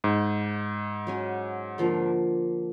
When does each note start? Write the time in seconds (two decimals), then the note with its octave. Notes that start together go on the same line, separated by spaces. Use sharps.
0.04 G#2
1.07 F#3 C#4 G#5
1.78 D3 F3 A#3